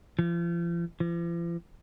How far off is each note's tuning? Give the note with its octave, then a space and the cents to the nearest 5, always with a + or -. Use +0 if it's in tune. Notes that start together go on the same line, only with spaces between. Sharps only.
F3 -40
F3 -45